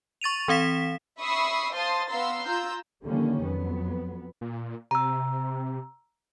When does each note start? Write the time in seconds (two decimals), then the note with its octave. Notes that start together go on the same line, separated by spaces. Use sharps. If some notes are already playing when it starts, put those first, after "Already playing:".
0.21 C#6 A6 D#7 F7
0.48 E3 C4 F5 B6 E7
1.20 E5 B5 C#6 D#6 E6 C7
1.75 C5 F5 A5 C6 D#6 A6
2.10 B3 F5 A#5 C6 E6
2.45 F4 A#5 E6 G6
3.04 D3 D#3 F3 G3 A#3 C#4
3.42 F2 F#3 B3
4.41 A#2
4.91 C3 A#5 E6